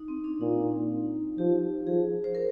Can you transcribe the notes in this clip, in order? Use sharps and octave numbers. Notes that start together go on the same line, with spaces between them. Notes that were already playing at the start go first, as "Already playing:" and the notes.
Already playing: D#4
C4
D4
A#2 D#4
F3 G4
F3 G#4
C5
A#4